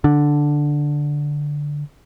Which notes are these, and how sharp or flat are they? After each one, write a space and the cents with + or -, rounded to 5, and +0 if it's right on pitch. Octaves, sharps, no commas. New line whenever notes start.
D3 +0 D4 +0